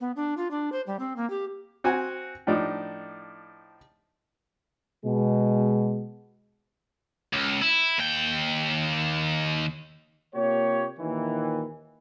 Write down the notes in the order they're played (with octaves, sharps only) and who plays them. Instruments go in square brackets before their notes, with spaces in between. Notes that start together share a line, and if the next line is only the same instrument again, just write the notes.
[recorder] B3
D4
F4
D4
C5
G3
C4
A#3
G4
[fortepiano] C4 F#4 F#5 G#5
A2 F3 D4 D#4
[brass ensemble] B2 G#3
[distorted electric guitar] C#2
E4
D#2 G5
[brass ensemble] C3 A#3 F4 G4 C#5
D#2 A#2 D#3 E3